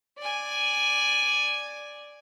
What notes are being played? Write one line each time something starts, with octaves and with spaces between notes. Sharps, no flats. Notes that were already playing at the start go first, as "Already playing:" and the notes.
D5 G#5